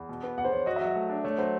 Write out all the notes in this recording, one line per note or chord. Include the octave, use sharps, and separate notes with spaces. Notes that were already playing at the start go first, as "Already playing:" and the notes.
Already playing: E2
B2
B3
E2 F#5
C5
E2 C#5
F#4 D#5
F#3 E5
D#5
A3
D4
A3 C#5
F#3 C5